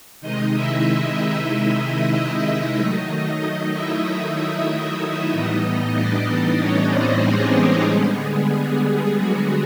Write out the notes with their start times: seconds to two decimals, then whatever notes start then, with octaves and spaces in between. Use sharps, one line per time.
0.21 C3 D#3 G#3 D#4 D#5
0.54 E4 E5
2.13 E4 E5
2.77 D#3 F#3 A3 D#4 D#5
3.73 E4 E5
5.32 A2 E3 G3 B3 D#4 D#5
5.96 D4 D5
6.60 C#4 C#5
6.92 C4 C5
7.23 G#3 G#4
7.88 D3 G3 B3
8.52 G#3 G#4
9.16 F#3 F#4